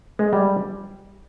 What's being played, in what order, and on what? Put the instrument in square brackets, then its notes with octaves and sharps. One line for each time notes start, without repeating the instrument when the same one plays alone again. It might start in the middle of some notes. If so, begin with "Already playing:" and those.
[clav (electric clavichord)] G#3
G3